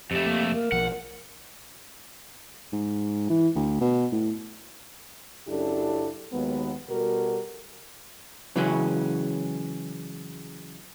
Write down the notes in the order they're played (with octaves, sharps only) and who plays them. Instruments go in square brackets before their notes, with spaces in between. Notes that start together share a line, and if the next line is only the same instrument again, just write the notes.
[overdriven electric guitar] F2 A3 [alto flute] G4
[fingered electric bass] A#3
[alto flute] A#4
[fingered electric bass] B1 F3 [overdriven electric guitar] F#5
[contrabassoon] G#2
E3
D2
B2
A2
[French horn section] F#2 C#3 D4 E4 G4 A4
D#2 D#3 F#3 G#3 B3
B2 G3 F#4 A4 A#4
[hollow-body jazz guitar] C#3 E3 F#3 G#3 C#4